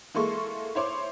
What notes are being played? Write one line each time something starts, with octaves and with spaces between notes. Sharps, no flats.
E3 G#3 A#3 A4 C6 C#6
E4 C5 C#5 C6 D6